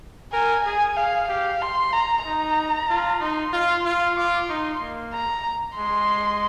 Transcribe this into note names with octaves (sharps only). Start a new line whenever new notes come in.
A#4 G#5
G#4 G#5
G#4 F5
G4 F5
C6
A#5
D#4 A#5
F4
D#4 C6
F4
F4
F4 D6
D#4 C6
A#3
A#5
G#3 C6